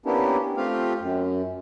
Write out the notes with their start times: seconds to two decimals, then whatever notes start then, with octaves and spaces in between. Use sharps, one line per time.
0.06 A#3 B3 C#4 D4 E4 G4
0.57 A3 C4 F4 G4 F5
1.00 F#2